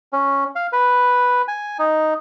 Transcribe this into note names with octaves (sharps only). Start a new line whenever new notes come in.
C#4
F5
B4
G#5
D#4